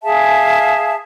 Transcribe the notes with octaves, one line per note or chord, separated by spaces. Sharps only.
G#4 E5 F5 A5